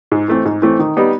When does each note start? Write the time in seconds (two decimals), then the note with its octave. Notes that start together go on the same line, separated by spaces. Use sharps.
0.12 G#2
0.28 E3 A3 C4
0.45 G#2
0.62 E3 A3 C4
0.79 D#3
0.97 G3 B3 D#4